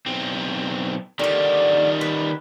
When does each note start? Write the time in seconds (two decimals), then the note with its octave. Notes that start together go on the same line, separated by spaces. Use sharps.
0.06 B1 C4
1.19 D3 D#3 G3 D5
2.01 B4